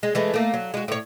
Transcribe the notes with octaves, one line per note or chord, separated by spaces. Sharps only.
G#3
E3 G#3 A3
A3 A#3
F#3
G#3 F#4
A2 C#5